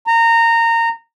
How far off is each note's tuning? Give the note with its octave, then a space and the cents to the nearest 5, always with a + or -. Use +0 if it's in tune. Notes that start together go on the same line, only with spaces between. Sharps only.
A#5 -20